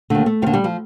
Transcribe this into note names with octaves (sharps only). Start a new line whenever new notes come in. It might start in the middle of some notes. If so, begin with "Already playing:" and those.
D#2 D3 A3
A3
D#2 D3 F3
G3
F3